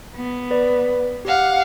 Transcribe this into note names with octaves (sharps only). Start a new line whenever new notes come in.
B3
B4 D5
G4 F5 F#5